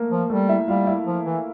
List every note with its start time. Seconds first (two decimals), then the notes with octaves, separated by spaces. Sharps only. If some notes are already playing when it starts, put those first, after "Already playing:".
Already playing: A3 A#3 A#4
0.11 F3
0.30 G3 A3 A4
0.49 E4 E5
0.68 G3 F4 F5
0.87 E4 E5
1.06 F3
1.25 E3